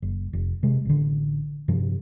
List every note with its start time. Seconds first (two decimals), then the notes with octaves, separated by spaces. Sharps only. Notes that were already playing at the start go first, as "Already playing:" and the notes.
0.02 F#1
0.33 F1
0.63 C3 G#3
0.85 A1 D3
1.68 G2 C3 F3